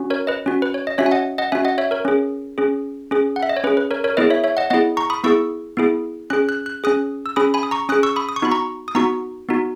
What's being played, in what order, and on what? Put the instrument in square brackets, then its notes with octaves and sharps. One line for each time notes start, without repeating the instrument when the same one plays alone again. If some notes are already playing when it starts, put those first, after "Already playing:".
Already playing: [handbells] C#4 F#4
A#4 C#5
B4 D#5
C#4 F#4
B4
C#5
D#5
C#4 F#4 C#5 E5
G#5
D#5 F#5
D#5 F#5
C#4 F#4 E5 G#5
D#5 F#5
C#5 E5
A#4 C#5
C#4 G#4
C#4 G#4
C#4 G#4
F#5
E5
D#5
C#5
C#4 G#4 B4
B4
A#4 C#5
A#4 C#5
B3 E4 G#4 B4 D#5
C#5 E5
C#5 E5
D#5 F#5
B3 E4 G#4 D#5 F#5
A#5 C#6
B5 D#6
B3 E4 G#4 C#6 E6
B3 E4 G#4
C#4 G#4 F#6
F#6
F#6
C#4 G#4 D#6 F#6
E6
C#4 G#4 B5 D#6
G#5 B5
D#6
A#5 C#6
C#4 G#4 D#6 F#6
C#6 E6
B5 D#6
D#6
C#6
B3 D#4 F#4 B5
A#5 C#6
D#6
B3 D#4 F#4 A#5 C#6
B3 D#4 F#4